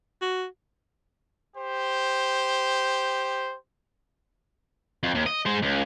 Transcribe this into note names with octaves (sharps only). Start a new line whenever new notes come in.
F#4
G4 C5
F2
D#2
D#5
G#3 C5
C#2